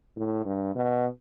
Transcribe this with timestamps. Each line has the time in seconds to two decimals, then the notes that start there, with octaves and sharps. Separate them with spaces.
0.17 A2
0.46 G2
0.76 B2